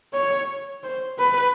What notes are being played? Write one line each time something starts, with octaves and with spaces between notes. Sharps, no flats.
C#5
C5
B4